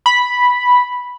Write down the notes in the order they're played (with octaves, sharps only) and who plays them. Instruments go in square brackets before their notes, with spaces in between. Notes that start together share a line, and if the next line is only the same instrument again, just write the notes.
[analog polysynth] B5